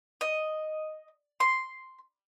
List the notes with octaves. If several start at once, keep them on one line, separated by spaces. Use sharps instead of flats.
D#5
C6